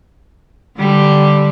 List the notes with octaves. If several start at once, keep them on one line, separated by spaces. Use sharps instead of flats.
D3 G3